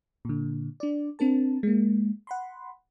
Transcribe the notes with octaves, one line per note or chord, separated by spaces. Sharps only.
A#2 D3
D4 D5
C4 D4 A#4 A5
G#3 A#3
F#5 B5 C6